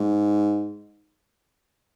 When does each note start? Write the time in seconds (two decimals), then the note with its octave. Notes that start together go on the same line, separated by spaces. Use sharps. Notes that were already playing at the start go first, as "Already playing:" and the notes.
Already playing: G#2